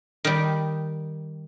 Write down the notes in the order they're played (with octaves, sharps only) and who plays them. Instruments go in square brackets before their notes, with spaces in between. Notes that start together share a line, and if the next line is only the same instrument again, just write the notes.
[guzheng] D#3 G3